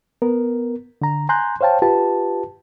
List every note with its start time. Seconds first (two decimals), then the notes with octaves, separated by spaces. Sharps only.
0.22 B3 A#4
1.02 D3 A#5
1.29 G#5 A#5 C6 F#6 G6
1.61 C5 C#5 F5 G5 A5
1.82 F4 G4 B4 A5